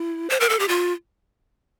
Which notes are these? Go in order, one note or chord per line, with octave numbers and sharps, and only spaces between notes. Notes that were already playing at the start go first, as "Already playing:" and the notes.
Already playing: E4
C5
A#4
A4
G4
F4